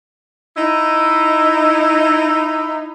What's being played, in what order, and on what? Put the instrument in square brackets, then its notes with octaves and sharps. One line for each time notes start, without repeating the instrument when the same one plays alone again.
[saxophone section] D#4 E4 D#5